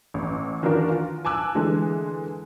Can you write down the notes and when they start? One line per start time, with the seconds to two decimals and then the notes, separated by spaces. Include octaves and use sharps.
0.14 A1
0.63 D#3 E3 D4 F4 F#4 A#4
0.89 F4
1.25 G#5 A5 D6 E6 F#6
1.55 D3 E3 G#3